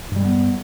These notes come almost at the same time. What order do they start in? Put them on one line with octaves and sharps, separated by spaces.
G2 G3 G#3 B3